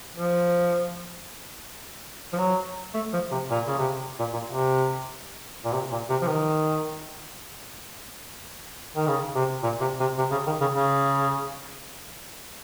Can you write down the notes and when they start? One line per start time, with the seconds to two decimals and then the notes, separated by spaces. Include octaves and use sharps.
0.16 F3
2.33 F3
2.38 F#3
2.95 A3
3.13 F3
3.31 C3
3.50 A#2
3.67 C#3
3.78 C3
4.19 A#2
4.34 A#2
4.48 C3
5.65 A#2
5.73 C3
5.92 A#2
6.10 C3
6.22 F3
6.28 D#3
8.96 D#3
9.08 C#3
9.35 C3
9.63 A#2
9.81 C3
10.00 C3
10.19 C3
10.32 C#3
10.47 D#3
10.61 C#3
10.74 C#3